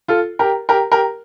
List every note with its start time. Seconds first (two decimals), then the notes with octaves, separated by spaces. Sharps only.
0.08 F4 A4
0.39 G4 A#4
0.69 G4 A#4
0.92 G4 A#4